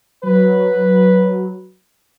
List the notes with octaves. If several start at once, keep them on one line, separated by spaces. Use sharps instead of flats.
F#3 B4